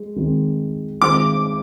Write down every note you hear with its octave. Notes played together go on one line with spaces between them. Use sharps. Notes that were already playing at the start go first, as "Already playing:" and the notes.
Already playing: G#3
D#3 G#3 C4
D#3 G#3 C4 D6